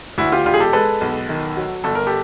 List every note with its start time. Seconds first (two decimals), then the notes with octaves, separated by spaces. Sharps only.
0.18 D2 E4 F#4
0.32 F4 G4
0.46 E1 F4 G4
0.54 G#4
0.60 G4 A4
0.73 G#3 A4 B4
1.01 B1
1.29 D#3
1.57 F#3
1.84 G1 A4
1.95 A#4
2.07 G4 A4